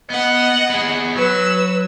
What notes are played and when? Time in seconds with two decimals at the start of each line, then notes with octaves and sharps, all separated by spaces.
0.10 B3 D#5 F#5
0.70 B3 G#4
1.15 F#3 B4 E6